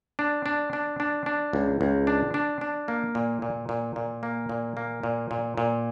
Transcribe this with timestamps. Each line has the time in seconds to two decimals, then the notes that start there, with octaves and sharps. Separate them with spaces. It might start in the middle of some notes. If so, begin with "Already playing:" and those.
0.19 D4
0.46 D4
0.73 D4
1.00 D4
1.26 D4
1.53 C#2
1.81 C#2
2.07 D4
2.34 D4
2.61 D4
2.88 A#3
3.15 A#2
3.42 A#2
3.69 A#2
3.96 A#2
4.23 A#3
4.49 A#2
4.77 A#3
5.03 A#2
5.31 A#2
5.57 A#2